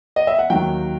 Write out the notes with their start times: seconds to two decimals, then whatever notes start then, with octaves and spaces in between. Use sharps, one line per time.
0.16 D#5
0.27 E5
0.39 F#5
0.50 D#2 D#3 F#3 G5